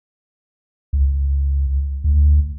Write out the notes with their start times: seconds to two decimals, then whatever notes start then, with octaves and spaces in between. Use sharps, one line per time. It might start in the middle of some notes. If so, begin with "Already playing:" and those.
0.93 C#2
2.04 D2